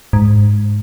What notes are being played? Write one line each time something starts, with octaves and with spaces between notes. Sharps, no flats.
G#2